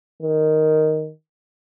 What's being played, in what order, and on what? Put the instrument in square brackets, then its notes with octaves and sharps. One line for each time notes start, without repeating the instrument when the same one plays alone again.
[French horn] D#3